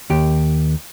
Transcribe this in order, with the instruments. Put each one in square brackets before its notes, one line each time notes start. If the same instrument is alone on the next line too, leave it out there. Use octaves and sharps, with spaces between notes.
[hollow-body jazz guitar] D#2 G4